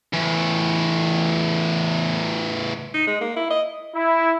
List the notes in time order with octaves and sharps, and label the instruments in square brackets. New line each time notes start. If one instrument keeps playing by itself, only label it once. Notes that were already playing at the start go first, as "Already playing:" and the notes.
[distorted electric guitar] E2 A2
[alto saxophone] D#4
G#3
A#3
E4
D#5
[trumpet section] E4